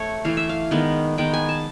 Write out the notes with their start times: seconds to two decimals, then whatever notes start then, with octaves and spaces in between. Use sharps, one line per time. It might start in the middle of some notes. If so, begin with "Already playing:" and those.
Already playing: A3 C#5
0.25 E3 A3 F5
0.37 E5
0.49 F5
0.71 D#3 G#3 B3
1.18 D#3 G#3 B3 G5
1.34 G#5
1.49 A5